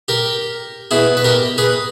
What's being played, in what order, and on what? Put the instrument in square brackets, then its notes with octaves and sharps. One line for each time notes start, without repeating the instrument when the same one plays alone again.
[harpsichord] G4 A#4
B2 E4 G#4
B4
G4 A#4
G#4 B4